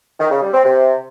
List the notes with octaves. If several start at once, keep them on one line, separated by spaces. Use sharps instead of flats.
D#3
C#3
G3
C4
C3